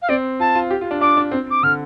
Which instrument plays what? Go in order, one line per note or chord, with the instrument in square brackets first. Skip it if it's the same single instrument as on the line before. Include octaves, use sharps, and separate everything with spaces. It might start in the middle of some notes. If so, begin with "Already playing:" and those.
[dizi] F5
[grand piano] C4 [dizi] D5
[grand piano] F4 [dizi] A5
[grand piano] F4
G4
F4
D4
[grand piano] D4 [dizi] D6
[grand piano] D4
C4
[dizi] D6
[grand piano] D3 [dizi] F6